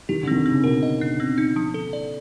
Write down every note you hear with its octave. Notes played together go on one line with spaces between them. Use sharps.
D#3 G4
D3
D#3 C4
D3
C4
C#3
B2 A#4
D#5
D4
C4
D#4
F3
A4
D5